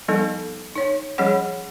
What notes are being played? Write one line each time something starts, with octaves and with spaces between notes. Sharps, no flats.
F3 G3 B3 D#4 A4
D#4 C#5
F3 G3 C#4 G#4 C#5 F#5